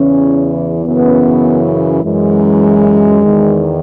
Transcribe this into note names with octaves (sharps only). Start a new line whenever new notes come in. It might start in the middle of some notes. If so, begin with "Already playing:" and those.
Already playing: E2 C#3 E3 C#4
F#2 C#3 E3 B3
F#2 E3 G#3
E2 D#3